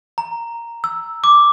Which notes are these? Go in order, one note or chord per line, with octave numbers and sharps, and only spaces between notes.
A#5
E6
D6